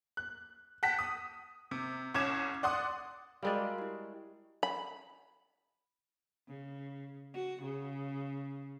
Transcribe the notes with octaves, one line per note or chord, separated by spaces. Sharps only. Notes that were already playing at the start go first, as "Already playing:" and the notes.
F#6
F#5 G5 A5 B6
D#6
C3
C2 C#4 D6 G#6 E7
D5 F#5 C6 D#6
G3 G#3 F#4 A#4 D5 F5
E4 G4
B5
C#3
F#4
C#3